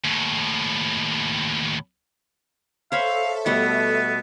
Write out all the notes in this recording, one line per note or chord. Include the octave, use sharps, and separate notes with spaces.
D#2 A2
A4 C5 C#5 E5 F5 B5
B2 G3 A3 B3